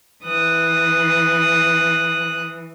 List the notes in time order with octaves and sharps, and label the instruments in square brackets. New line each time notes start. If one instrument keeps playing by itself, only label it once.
[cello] E3 [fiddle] D#6 F#6